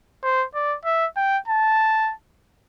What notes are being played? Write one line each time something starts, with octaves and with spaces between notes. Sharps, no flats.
C5
D5
E5
G5
A5